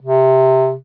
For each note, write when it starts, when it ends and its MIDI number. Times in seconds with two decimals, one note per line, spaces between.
0.02 0.74 48